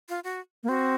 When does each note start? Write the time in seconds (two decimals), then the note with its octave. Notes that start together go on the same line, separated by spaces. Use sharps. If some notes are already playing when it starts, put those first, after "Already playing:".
0.09 F4
0.24 F#4
0.63 A#3
0.68 C4 F#4